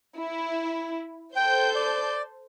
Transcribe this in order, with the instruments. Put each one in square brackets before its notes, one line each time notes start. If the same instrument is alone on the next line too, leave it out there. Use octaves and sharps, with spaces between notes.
[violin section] E4
[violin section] A4 C5 G6 [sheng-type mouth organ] G5
[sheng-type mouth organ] D5